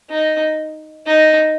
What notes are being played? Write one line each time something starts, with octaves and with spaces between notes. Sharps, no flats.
D#4
D#4